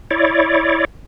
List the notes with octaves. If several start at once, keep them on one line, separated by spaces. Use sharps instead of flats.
E4 C#5 D5